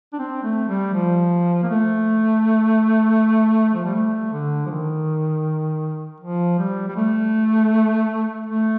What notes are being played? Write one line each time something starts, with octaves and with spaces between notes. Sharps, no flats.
D4
C4
A3
G3
F3
A#3
A3
F3
G3
A3
D3
F3
D#3
F3
G3
G3
A3
A3